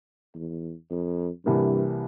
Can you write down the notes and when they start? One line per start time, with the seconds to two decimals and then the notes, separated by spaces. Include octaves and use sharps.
0.35 E2
0.90 F2
1.45 C2 G2 C3 E3 G3 A#3